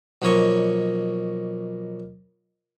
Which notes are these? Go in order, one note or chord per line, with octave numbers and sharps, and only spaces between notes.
B1 F3 A#3 C#5 D#5 C#6